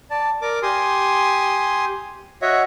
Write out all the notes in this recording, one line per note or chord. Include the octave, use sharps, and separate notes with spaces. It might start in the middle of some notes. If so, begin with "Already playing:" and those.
D5 A5
A#4 D5 D6
G4 G#5 C6 D#6
F#4 C#5 D#5 E5 F#5